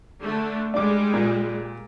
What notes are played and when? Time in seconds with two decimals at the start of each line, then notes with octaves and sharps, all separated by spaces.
0.22 D3 A3
0.74 G3 G#3 D4 G#4 D6
1.14 A#2